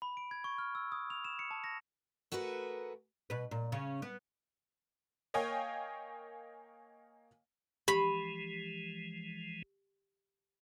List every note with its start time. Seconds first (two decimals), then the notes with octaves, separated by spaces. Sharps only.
0.02 B5
0.17 D7
0.31 G#6
0.44 C#6
0.58 F6
0.75 E6
0.92 D#6
1.10 F7
1.25 E7
1.39 C#7
1.51 A5
1.64 A#6
2.32 A3 F#4 G#4 A#4 B4
3.30 B2 B4
3.51 A#2
3.72 C#3 C#4
4.02 B3
5.34 A#3 C#5 D#5 F5 G5 G#5
7.88 E3 F3 G#3 G4 B5